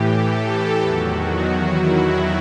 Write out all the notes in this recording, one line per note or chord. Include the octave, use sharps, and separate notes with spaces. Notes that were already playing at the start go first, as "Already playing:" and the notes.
Already playing: A2 E3 G4
A4
E2 D#3 F#3 F#4
E4